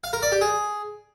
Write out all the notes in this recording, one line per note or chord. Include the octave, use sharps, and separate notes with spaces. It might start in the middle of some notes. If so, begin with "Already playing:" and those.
F5
A#4
D5
G4
G#4